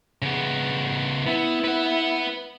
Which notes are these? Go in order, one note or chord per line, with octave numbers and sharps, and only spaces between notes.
C#3 B3
B3 E4
B4 F#5